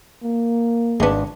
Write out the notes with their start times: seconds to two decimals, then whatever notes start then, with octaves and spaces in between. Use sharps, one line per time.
0.23 A#3
1.00 G#1 G#3 B3 D4